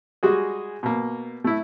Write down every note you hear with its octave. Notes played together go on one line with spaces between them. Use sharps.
G3 G#3 F#4 G#4
B2 A#3
A3 E4